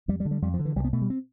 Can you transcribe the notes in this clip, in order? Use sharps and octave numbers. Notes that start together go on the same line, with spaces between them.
F2 G3
G3
D3
G3
F2 G3
F3
D3
E3
C2 G3
B3
B2 A3
G3
C4